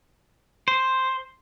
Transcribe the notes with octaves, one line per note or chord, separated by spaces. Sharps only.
C5